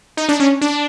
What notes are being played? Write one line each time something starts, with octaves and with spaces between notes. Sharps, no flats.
D#4
D4
C#4
D4